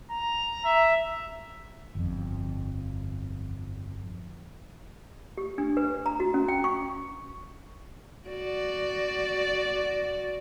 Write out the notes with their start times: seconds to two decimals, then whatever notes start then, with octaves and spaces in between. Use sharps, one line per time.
0.11 A#5
0.65 E5
1.95 G1 F2
5.38 G4
5.58 D4
5.77 B4
6.06 A#5
6.20 F#4
6.34 C#4
6.48 G5
6.64 C#6
8.28 F#4 D5